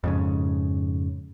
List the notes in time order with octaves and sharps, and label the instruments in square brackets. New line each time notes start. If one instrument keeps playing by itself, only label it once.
[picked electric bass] F2 G#2 C#3